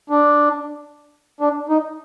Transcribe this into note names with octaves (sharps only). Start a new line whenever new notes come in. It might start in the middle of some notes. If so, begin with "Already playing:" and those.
D4
D4
D#4